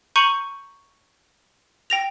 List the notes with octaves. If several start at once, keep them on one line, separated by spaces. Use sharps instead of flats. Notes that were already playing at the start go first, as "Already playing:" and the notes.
A#5 C#6 G6 C#7 D#7 F#7
G5 A#6 F7